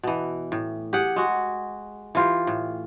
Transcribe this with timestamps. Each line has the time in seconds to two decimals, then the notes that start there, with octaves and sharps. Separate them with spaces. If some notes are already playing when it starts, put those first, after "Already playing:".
0.03 B2 E3
0.52 A2
0.93 G4 G#4 F#5
1.16 G#3 F#4
2.15 E3 F4 G4
2.47 A2